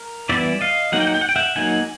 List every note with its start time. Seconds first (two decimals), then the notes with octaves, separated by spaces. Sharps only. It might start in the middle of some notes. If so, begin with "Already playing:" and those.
Already playing: A#4
0.29 E3 G3 B3 E4 D5 E5
0.61 D#5 F5
0.92 F#3 A#3 D#4 F#5
1.00 G5
1.07 F#5
1.14 G5
1.21 F#5
1.29 G5
1.36 E5 F#5
1.56 F#3 A#3 D#4 F#5 G#5